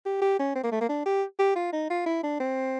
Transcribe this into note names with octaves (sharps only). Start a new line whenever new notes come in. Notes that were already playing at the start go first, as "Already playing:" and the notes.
G4
G4
C#4
C4
A#3
A3
A#3
D4
G4
G4
F4
D#4
F4
E4
D4
C4